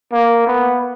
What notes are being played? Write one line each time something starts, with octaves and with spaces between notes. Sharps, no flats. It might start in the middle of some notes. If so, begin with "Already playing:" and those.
A#3
B3